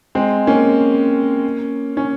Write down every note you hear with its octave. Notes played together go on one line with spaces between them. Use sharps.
G#3 C4
A#3 C#4
C#4